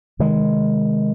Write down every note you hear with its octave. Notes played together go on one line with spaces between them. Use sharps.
C3 D#3 G#3